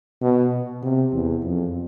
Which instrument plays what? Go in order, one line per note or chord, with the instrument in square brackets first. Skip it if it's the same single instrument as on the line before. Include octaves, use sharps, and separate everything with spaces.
[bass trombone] B2
C3
E2
F2